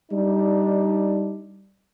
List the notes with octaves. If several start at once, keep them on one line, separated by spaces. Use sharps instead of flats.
G3 D4 D#4